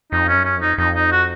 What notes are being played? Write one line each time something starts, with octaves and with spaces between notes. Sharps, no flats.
F2 D#4
C#4
F#2
C#4
F2 D#4
F2 D#4
D#4
F#4